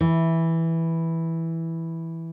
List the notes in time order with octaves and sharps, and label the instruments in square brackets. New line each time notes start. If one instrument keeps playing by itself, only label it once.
[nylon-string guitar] E3